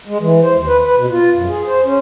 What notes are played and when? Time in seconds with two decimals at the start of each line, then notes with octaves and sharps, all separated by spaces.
0.07 G#3
0.20 E3
0.41 C5
0.55 D#2
0.67 B4
0.82 B4
0.96 B2
1.10 F4
1.34 F#2
1.48 G#4
1.66 C5
1.84 C#4